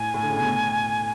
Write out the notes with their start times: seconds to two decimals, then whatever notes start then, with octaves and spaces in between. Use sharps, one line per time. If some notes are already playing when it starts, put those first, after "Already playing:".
Already playing: A2 G#5
0.14 A2
0.23 D3
0.30 C#3
0.37 B2
0.46 A2